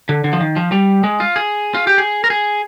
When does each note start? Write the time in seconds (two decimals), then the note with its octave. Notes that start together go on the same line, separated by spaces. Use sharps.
0.09 D3
0.24 D3
0.33 F3
0.41 D#3
0.56 F3
0.72 G3
1.04 G#3
1.20 F4
1.36 G#4
1.74 F4
1.87 G4
1.98 G#4
2.24 A#4
2.30 G#4